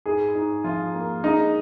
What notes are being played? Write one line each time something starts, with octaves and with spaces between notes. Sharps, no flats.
G#2 G#4
G#2
F3 F4
A#3
G#3 D#4